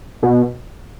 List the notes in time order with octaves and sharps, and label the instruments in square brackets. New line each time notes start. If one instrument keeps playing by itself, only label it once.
[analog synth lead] B2